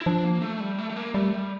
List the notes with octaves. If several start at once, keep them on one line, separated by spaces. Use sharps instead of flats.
E4
F3 D4
A#3
A3
G3
A3
A3
A#3
G3 A3
G3